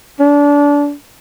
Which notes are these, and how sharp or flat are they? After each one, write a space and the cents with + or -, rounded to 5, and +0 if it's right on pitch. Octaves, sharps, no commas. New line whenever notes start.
D4 -25